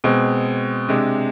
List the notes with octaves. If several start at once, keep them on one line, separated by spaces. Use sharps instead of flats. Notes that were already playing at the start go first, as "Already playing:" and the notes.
B2 G#3 C4
C3 G#3 D4